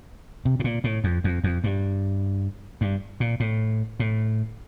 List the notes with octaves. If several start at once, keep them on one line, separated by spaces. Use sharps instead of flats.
C3
A2
A#2
A2
F2
F2
F2
G2
G2
A#2
A2
A2